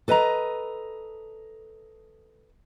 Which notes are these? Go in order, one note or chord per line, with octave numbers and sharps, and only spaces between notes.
A4 B4 D#5 G#5 A#5